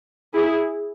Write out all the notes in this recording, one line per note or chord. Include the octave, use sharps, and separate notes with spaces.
E4 G#4